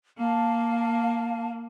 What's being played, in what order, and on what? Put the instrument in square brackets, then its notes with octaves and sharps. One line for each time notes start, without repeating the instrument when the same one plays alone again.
[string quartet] A#3 [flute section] F5 A5